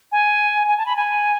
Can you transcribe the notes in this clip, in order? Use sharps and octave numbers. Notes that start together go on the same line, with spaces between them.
G#5
G#5
A5
B5
G#5